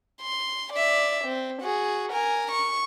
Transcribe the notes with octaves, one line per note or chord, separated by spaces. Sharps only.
C6
D5 E5
C4
F#4 G#4
A#4 G#5
C#6